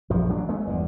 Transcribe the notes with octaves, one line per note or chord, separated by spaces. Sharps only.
A#1 F#2 F3
A1 F#3 D4
G#3 A3 B3
G1 E2 D3